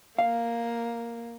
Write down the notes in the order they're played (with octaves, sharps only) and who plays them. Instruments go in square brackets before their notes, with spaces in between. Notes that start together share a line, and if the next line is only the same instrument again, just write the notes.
[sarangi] A#3 [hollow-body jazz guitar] F5